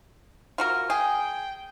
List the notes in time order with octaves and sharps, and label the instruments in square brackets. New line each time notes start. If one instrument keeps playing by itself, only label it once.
[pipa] F4 F#4 A#4
[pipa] G#4 [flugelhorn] G5